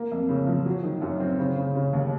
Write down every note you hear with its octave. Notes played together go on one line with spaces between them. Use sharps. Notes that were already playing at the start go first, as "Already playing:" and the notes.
Already playing: A#3
F2
C#3
F3
F#3
D#3
F#2
C4
C#3
C#3
C#3
D#2